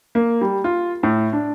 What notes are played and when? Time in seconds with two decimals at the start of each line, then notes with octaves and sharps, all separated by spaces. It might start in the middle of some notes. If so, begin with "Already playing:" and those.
0.15 A#3
0.41 G3
0.64 F4
1.03 A2
1.33 D4